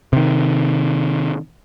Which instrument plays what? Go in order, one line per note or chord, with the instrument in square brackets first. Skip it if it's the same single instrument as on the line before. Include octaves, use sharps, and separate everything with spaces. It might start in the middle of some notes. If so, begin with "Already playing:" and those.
[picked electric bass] C3 D#3